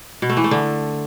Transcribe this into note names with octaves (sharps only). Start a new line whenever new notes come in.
B2
A3
E3
A3
D3